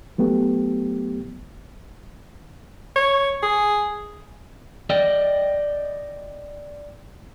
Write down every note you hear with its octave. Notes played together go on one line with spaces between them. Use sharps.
F#3 A3 B3 G4
C#5
G#4
D5 D#5 G5